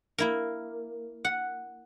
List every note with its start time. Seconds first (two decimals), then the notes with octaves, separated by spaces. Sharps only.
0.18 A#3 E4 A#4
1.25 F#5